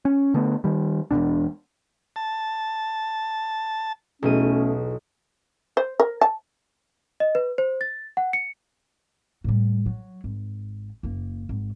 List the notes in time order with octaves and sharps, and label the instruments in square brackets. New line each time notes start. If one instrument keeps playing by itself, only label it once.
[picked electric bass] C#4
D3 A3 B3
D#3 G3
E1 C#2 B2 D4
[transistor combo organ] A5
[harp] B1 D#7 [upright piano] E2 B2 G#4 [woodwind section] A3 C#4
[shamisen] C5
A#4
A5
[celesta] D#5
B4
C5
A6
F#5
C#7
[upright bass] A2 G3
F#3
G#1
F#1 A#3
G#1